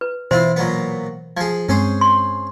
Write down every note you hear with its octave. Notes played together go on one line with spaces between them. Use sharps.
B4
B2 E3 C4 E4 F4 C5
A#2 F#3 B3
F3 G#4 G#6
G2 G#3 C4 C#4 G#4 C5
C6